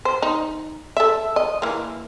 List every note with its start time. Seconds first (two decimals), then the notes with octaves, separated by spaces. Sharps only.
0.05 C5
0.22 D#4
0.97 A4 E5
1.36 D#5
1.62 E3 A#3